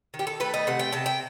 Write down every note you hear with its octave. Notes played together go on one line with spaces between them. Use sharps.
D#3
G4
A4
A3 B4
D#5
C3 F#5
G5
C3 A5
G5